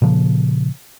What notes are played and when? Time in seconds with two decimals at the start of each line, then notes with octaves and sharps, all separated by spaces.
0.02 A#2 C#3 F3